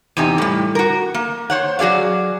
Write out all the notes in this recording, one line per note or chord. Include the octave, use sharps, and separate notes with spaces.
E2 C3 D#4 G4 G#5
A2 G3
F#4 A#4
A#3
C5 C#5 F#5
F#3 F#4 G#4 D5 F5